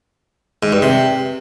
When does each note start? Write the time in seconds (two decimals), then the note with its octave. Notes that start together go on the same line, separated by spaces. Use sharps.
0.63 G#2
0.73 G2
0.82 C3